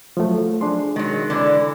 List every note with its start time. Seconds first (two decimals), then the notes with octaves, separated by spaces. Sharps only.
0.17 F3 F#3 A3
0.61 D4 G#4 C6
0.96 D#3 F#3 G#3
1.30 D3 E3